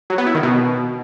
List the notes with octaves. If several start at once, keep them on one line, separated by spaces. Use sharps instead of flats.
F#3
B3
E4
D#3
B2